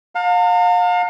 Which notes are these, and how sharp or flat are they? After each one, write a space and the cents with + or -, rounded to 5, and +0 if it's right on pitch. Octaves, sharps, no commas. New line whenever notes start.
F5 +35 A#5 -45